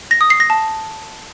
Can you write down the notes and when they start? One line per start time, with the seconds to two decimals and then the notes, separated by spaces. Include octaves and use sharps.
0.11 A#6
0.21 D#6
0.30 C7
0.40 A#6
0.50 A5